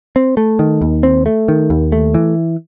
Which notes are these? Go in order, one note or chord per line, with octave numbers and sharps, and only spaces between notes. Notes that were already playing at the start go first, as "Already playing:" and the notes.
C4
A3
D#3
D#2
C4
A3
D#3
D#2
A3
E3